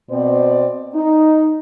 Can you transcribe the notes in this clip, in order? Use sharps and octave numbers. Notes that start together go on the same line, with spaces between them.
B2 C4 C5 D5
D#4